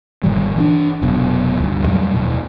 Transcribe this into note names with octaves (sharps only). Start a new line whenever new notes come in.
G1 A#2 D#3 G3
E3 C4 D4
F1 B2 F#3
D2 G2
F2 A#2 F#3 G3
D#2 B2